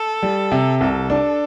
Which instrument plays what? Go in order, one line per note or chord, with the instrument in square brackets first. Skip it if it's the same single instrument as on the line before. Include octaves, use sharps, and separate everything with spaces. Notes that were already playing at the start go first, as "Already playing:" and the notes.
Already playing: [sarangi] A4
[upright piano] G3
C3
[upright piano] C2 [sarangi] A4
[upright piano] D4